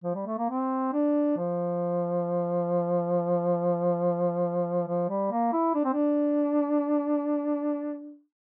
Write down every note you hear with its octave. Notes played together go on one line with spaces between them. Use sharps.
F3
G3
A3
A#3
C4
D4
F3
F3
G3
A#3
E4
D4
C4
D4